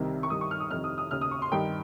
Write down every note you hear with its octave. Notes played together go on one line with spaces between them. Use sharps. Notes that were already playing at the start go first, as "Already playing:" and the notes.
Already playing: C2 C3 D#3
C#6
G2 D#3 D#6
C#6
F6
D#6
F2 C3 D#3 F6
D#6
D#6
D#2 C#3 F6
D#6
C#6
C6
G2 D#3 G5